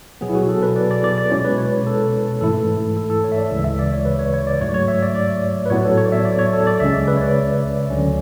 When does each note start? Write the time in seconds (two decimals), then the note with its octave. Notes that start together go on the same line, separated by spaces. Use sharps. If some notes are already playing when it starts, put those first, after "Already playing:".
0.21 B2 F#3 B3 G#4
0.29 E4
0.35 F#4
0.49 A4
0.63 B4
0.76 D5
0.91 D5
1.04 D5
1.18 D5
1.31 B2 G#3 C#4 E4 C#5
1.45 B4
1.58 C#5
1.87 A4
2.41 G#2 E3 A3 E4 A4
2.97 A4
3.10 A4
3.24 C#5
3.32 E5
3.38 D5
3.50 D2 C#3 E3 G#3 E5
3.64 E5
3.79 D5
3.93 C#5
4.05 B4
4.19 C#5
4.34 C#5
4.47 D5
4.61 G#2 F#3 A3 C#5
4.74 C#5
4.88 E5
5.03 D5
5.15 D5
5.66 B4
5.70 A2 F#3 B3 E4 C#5
5.85 A4
5.97 C#5
6.05 D5
6.12 E5
6.25 D5
6.39 C#5
6.53 A4
6.67 D5
6.80 C#2 C#3 G#3 C#4 E5
6.94 D5
7.08 B4
7.17 C#5
7.21 D5
7.90 D2 D3 F#3 C#4